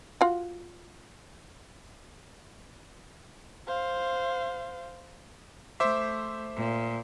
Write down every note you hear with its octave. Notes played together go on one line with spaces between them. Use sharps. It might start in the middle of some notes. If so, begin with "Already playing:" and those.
F4 F#4
C5 F5
A3 C5 E5 D6
A#2